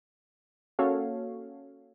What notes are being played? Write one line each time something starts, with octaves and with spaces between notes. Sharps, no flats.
A#3 C#4 F#4 A4 C#5 F5